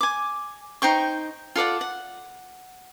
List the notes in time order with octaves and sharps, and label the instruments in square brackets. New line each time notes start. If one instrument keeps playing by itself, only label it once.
[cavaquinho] G#5 D6
D#4 C5 G5 C#6
F4 A4 D5 F#5
F#5